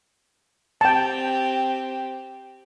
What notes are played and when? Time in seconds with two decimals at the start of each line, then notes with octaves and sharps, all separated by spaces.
0.81 C4 G4 G5 A5